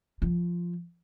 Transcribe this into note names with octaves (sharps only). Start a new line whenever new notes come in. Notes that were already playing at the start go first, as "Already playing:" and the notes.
F3